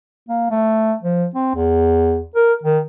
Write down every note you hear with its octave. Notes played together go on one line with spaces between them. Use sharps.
A#3
A3
F3
C4
E2
A#4
D#3